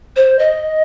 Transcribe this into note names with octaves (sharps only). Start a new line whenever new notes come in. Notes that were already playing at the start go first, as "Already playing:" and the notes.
C5
D#5